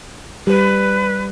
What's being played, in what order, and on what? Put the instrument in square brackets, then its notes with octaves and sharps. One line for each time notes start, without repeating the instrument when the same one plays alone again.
[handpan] G3 [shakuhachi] B4